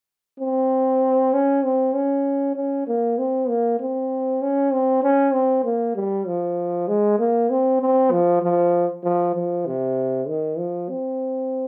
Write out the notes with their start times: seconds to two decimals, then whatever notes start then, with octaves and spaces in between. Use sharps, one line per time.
0.40 C4
1.33 C#4
1.63 C4
1.95 C#4
2.56 C#4
2.88 A#3
3.19 C4
3.49 A#3
3.80 C4
4.42 C#4
4.73 C4
5.03 C#4
5.33 C4
5.64 A#3
5.96 G3
6.27 F3
6.88 G#3
7.19 A#3
7.50 C4
7.81 C4
8.11 F3
8.43 F3
9.04 F3
9.35 F3
9.66 C3
10.28 D#3
10.58 F3
10.90 C4